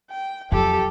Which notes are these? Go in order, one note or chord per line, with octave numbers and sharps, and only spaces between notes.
G5
F2 F#3 G4 A4